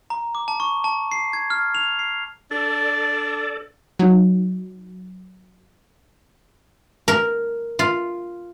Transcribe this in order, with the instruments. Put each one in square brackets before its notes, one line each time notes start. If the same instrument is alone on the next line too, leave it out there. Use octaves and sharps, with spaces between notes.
[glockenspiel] A#5
D6
A5
C#6
A5
C7
G#6
F6
F7
C7
[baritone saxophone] D4 [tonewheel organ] A4 D5 [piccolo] A6
[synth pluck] F#3 D#4
[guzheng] A#4
F4